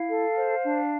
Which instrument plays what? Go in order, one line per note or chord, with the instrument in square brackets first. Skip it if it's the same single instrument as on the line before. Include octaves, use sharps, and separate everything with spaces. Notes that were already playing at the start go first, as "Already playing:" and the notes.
Already playing: [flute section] E4 F5
A4
C5
D4